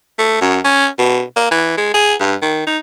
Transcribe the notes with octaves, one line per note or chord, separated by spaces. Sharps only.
A3
F#2
C#4
B2
A#3
E3
G#3
G#4
G2
D#3
D#4